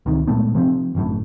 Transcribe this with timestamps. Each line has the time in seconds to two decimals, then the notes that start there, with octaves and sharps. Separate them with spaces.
0.06 C#2 C3 D#3
0.27 A#2 G#3 A3 B3
0.55 C3 F3 C4
0.95 G1 F#2 A2